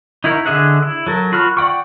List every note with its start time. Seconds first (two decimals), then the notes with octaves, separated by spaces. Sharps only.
0.24 D#4 E4 F#4 A#4
0.46 D3 G#4 D#5 E5 F#5
0.83 E4
1.07 F#3 A4 A#4
1.32 F4 F#4 B5 F6
1.57 D5 F#5 G5 C#6